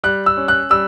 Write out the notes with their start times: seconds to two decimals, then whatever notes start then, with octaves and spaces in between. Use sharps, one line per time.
0.04 G3 F#6
0.26 E6
0.37 C#4
0.48 F#6
0.70 G3 E6